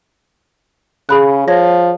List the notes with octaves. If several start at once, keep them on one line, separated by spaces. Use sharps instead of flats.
C#3 G#4 B5 F#6
F3 C#5 A#6